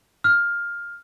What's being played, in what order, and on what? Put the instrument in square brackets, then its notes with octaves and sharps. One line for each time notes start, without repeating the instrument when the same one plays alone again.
[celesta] F6